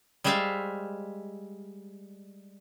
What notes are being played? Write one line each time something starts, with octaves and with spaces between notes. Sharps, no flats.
G3 G#3 C5 E5 F5 A5